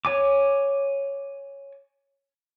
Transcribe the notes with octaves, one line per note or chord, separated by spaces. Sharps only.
C#5 G#5 D6